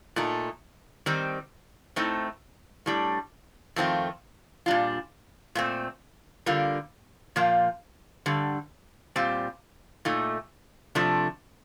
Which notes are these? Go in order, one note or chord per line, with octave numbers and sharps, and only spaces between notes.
A#2 A3 D#4
D#3 G3 C4 D#4
A2 A3 C4 D#4
A2 G3 D4
F2 D#3 A3 C4 F4
A#2 G3 D4 F4
A#2 A3 C4
D3 G3 A#3 F4
A#2 F3 A#3 F4
G2 D3 G3
A#2 G3 C4 F4
A#2 A3 D#4
C3 F3 A3 D4